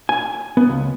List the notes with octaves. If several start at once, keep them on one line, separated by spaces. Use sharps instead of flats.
G#5
B3
C#2